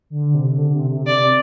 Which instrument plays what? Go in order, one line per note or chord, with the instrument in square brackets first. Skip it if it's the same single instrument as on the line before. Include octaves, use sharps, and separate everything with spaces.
[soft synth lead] D3
C3
D3
C3
C3
[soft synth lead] C3 [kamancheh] D5